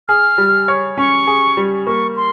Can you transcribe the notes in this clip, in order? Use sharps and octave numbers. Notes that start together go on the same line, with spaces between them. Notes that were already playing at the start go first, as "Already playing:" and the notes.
G#4 F6
G3
C#5
C#4 C#6
G#4
G3
A#3 C#6
C6